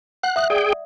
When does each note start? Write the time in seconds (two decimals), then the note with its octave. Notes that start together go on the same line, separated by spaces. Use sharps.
0.23 F#5 F#6
0.36 E5 D#6 F#6
0.50 G#4 D5 G5